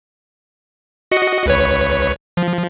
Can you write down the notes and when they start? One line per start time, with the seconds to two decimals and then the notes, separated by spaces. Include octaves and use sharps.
1.12 F#4 D#5 C#7
1.46 C#2 B4 C#5
2.37 F3